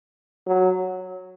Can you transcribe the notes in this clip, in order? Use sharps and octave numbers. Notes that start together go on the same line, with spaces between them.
F#3